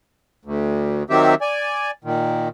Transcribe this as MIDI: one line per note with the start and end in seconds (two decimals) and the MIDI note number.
0.45 1.03 38
1.10 1.35 51
1.10 1.35 54
1.10 1.35 60
1.10 1.35 67
1.10 1.35 76
1.41 1.91 74
1.41 1.91 80
2.04 2.48 46
2.04 2.48 51